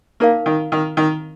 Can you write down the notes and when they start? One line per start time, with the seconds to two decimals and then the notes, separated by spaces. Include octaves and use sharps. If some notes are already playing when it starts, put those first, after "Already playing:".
0.20 A#3 D#4 A#4 F5
0.46 D#3
0.72 D#3
0.97 D#3